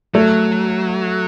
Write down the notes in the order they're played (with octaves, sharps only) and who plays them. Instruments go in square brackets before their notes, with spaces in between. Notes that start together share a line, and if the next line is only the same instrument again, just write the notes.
[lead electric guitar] F#3 [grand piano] A3